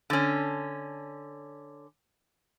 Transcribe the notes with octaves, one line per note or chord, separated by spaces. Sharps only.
D3 C#4